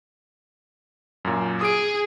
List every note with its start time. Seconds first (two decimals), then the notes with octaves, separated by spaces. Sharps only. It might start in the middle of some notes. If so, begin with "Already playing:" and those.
1.25 F#2 A#2
1.61 G#4 D#6 D7